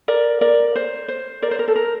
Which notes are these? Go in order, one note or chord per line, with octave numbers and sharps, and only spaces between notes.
A#4 D5
A#4 D5
C5
C5
A#4 D5
C5
A#4
A4
A#4